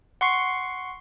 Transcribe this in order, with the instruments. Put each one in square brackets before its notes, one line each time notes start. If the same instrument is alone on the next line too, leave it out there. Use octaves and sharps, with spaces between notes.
[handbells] F#5 C6 C#6 C7